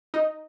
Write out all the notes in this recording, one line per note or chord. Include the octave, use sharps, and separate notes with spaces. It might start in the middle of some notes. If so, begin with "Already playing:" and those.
D#4 D#5